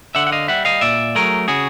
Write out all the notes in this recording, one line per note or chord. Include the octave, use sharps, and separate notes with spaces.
D3 E5 F#5
F#5
D#5 F5
G3 E5 F#5
D#5 F5
A#2 D5 E5
F#3 A3 G#4 A#4
C#3 F#4 G#4